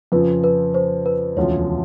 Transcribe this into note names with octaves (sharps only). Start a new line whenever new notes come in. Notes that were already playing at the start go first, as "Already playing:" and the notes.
F2 C#3 F3 B4
B4
C5
B4
E1 D2 C#3 F3 C#5